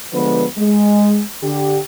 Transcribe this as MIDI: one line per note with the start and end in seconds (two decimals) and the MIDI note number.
0.14 0.45 50
0.14 0.45 53
0.14 0.45 56
0.14 0.45 59
0.14 0.45 71
0.58 1.22 56
1.43 1.78 50
1.43 1.78 67